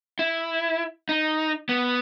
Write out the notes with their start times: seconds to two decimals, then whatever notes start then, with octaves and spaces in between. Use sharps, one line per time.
0.19 E4
1.09 D#4
1.69 B3